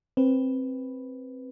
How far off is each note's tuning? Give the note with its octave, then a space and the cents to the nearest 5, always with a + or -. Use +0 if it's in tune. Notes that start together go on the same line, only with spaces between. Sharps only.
C4 +10 B4 +0